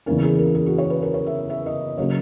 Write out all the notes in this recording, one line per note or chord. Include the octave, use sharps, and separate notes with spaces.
E2 C#3 E3 A#3 C#4 A#4
G#4
A#4
G#4
F#4
C#5
B4
A#4
C#5
E5
E5
D#5
C#3 F#3 A#3 C#5